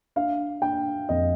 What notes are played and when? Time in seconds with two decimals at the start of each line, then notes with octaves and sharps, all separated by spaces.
0.16 D4 F5
0.62 D4 G5
1.09 F2 D#5